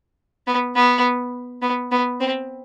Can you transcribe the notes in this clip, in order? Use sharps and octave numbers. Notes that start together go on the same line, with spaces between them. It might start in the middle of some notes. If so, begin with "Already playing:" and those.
B3
B3
B3
B3
C4